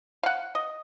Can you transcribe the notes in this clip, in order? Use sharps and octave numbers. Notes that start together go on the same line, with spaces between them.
F5 F#5
D#5